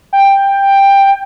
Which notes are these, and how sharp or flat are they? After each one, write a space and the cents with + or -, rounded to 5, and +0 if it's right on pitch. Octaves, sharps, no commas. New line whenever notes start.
G5 +10